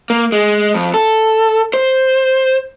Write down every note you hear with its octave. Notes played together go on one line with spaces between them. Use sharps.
A#3
G#3
F2
A4
C5